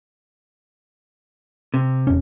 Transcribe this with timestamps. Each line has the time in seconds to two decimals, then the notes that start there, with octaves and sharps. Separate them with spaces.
1.74 C3
2.07 E1 C#4